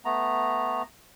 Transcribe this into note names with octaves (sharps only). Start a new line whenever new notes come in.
A3 B3 A#5